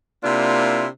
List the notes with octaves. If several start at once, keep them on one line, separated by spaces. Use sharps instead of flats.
C3 A#3 D4 E4 F4